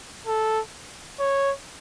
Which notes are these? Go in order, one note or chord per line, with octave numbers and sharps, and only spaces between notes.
A4
C#5